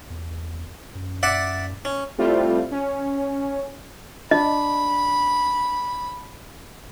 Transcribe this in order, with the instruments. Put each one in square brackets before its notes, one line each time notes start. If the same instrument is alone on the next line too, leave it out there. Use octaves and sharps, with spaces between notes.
[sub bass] E2
F#2
[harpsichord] D5 E5 F#5
C#4
[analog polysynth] G3 A3 C4 E4 F4
C#4
[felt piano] D4 [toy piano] D#5 [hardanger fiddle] B5